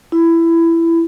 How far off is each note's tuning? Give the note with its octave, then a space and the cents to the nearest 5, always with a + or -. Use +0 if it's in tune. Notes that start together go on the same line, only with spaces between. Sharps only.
E4 +15